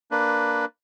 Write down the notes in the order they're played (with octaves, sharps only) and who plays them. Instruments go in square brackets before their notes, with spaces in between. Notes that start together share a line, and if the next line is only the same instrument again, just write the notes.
[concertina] A#3 D4 B4